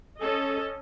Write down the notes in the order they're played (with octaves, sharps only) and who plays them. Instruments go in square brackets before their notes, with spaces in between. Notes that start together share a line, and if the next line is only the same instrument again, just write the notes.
[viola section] C#4 A4 D#5